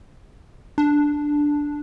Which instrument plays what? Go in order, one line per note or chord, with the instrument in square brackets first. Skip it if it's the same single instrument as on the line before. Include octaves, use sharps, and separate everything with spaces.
[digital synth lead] D4